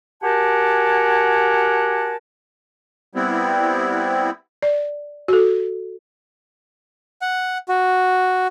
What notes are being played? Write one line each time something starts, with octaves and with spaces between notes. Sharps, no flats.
F#4 G4 A#4 F#5 G#5 A5
G3 B3 C4 E4
D5
F#4 A4
F#5
F#4